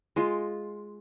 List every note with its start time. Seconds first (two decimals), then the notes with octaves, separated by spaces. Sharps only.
0.16 G#3 F4